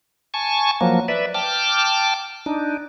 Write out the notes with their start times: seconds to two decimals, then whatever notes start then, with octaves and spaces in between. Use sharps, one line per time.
0.34 G#5 A5 C#6
0.81 F3 F#3 A#3
1.08 B4 D5 E5
1.34 G5 A5 D6 F6
2.46 D4 D#4